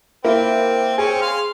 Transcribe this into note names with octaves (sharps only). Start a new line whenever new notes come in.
A#3 C4 E4
C4 C#4 G#4
F5 C6